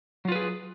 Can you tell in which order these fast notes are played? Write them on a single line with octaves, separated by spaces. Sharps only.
F#3 F4 B4 G#4